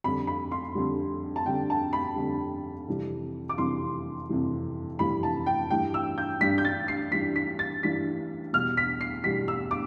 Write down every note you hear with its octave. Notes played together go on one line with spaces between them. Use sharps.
F2 D3 G3 B5
B5
C6
F2 D3 G3
A5
F2 D3 G3 G5
A5
B5
F2 D3 G3
F2 C3 E3 G3
D6
F2 C3 E3 G3 C6
F2 C3 E3 G3
F2 C3 E3 G3 B5
A5
G5
G2 E3 G3 D4 G5
E6
G6
G2 E3 G3 D4 B6
G6
A6
C7
G2 E3 G3 D4 B6
B6
A6
G2 E3 G3 D4 B6
E2 B2 G3 F6
B6
C7
E2 B2 G3 B6
E6
D6